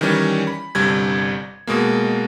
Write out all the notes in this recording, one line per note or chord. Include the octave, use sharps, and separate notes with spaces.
D#3 E3 G3 C#4
B5
G1 G2 C3 G3 G#6
B2 G#3 A#3